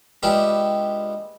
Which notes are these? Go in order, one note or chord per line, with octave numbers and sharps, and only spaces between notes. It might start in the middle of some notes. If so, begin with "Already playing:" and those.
G#3 B3 D4 E4 F4 G4